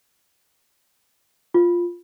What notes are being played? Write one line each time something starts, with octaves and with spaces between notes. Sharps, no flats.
F4